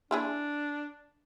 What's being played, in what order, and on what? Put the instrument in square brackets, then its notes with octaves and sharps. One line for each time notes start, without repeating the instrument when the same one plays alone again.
[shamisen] A#3 E4 G#4 [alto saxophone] D4